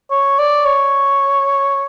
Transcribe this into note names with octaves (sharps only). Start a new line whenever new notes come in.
C#5
D5
C#5